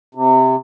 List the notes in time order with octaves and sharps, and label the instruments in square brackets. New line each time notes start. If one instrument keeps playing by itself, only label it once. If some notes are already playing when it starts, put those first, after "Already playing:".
[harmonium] C3